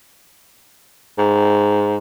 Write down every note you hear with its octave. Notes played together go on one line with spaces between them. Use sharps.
G#2